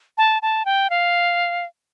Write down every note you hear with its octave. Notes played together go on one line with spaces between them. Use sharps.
A5
A5
G5
F5